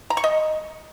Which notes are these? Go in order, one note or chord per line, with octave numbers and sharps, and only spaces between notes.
A#5
C#6
D#5